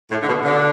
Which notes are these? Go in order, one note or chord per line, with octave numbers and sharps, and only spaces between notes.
A2
D3
B2
D3